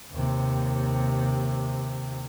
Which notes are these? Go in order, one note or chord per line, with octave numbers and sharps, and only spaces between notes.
D#2 C3